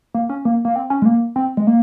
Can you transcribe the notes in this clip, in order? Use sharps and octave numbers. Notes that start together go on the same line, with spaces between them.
A#3
C#4
A#3
A#3
C4
C#4
G#3
A#3
C4
G#3
A#3